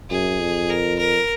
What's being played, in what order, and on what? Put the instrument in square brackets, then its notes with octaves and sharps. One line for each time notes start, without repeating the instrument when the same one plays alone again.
[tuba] F#2 [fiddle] G#4
[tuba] F2
[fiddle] A#4
A#4